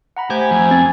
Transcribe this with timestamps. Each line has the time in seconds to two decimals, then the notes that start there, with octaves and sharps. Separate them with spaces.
0.17 F#5 A#5 B5
0.30 A3 G4 C5 G#5
0.51 F2
0.71 C4 A6